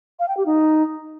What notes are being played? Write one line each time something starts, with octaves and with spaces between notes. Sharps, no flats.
F5
G5
G4
D#4